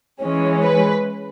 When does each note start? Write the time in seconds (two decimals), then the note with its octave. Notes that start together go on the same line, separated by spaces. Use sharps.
0.22 E3 G#3 C#4
0.63 B4